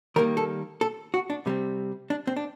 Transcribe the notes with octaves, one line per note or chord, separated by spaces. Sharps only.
D#3 G3 A#3 A#4
A4
A4
F#4
D4
C3 G3 C4
D4
C4
D4